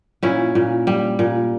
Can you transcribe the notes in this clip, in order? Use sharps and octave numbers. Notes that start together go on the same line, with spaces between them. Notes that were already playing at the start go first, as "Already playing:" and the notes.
A#2 C#4 E4
A#2
G3
A#2